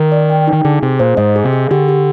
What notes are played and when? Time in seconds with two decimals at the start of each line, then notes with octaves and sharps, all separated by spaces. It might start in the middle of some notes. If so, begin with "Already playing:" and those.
Already playing: D#3 A#4
0.12 D5
0.30 G5
0.47 D#4
0.53 D#3
0.65 D3 G#4
0.82 C3 G#4
1.00 A#2 C5
1.17 G#2 D#5
1.36 G#4
1.44 C3
1.53 G#4
1.71 D3 G4
1.88 G4